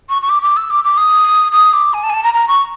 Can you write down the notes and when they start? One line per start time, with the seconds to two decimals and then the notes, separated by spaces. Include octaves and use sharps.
0.09 C#6
0.22 C#6
0.29 D6
0.42 D6
0.57 E6
0.70 D6
0.84 D6
0.97 D#6
1.52 D#6
1.73 D6
1.93 G#5
2.03 A5
2.10 G#5
2.14 A5
2.23 A#5
2.34 A#5
2.48 C#6